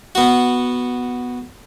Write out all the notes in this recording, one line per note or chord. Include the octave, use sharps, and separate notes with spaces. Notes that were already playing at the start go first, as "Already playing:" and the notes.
B3 F#4